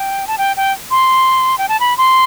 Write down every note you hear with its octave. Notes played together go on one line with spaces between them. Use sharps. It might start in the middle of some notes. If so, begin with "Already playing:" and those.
Already playing: G5
A5
G5
G5
C6
G5
A5
B5
C6